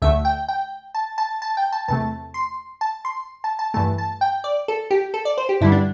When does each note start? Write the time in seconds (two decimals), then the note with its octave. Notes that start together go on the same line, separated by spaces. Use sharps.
0.02 D2 D3 A3 E5
0.25 G5
0.49 G5
0.95 A5
1.18 A5
1.42 A5
1.57 G5
1.73 A5
1.88 E2 C3 A3 A5
2.34 C6
2.81 A5
3.05 C6
3.44 A5
3.59 A5
3.74 G2 E3 A3 A5
3.98 A5
4.21 G5
4.44 D5
4.68 A4
4.91 G4
5.14 A4
5.25 D5
5.38 C5
5.49 G4
5.61 G2 D3 G3 E4
5.72 D4